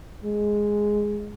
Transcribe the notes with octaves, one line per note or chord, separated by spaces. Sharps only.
G#3